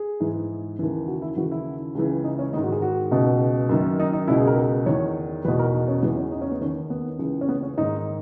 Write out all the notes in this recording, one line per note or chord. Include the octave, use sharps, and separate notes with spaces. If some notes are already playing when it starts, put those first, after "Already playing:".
Already playing: G#4
G#2 E3
D#2 C#3 E3
F#4
E4
D#2 C#3 E3 F#4
E4
C#2 C#3 E3
D#4
C#4
G#2 D#3 D#4
F#4
G#4
F#4
C#2 B2
F#2 D#3
D#4
D#4
C#2 B2 E4
G#4
A#4
E2 D#3 C#5
E2 B2 B4
A#4
D#4
C#4
E2 C#3 E3 B3
C#4
D#4
C#4
B3
D#2 D#3 C#4
B3
C#2 C#3 E3
C#4
B3
C#4
G#2 D#3 D#4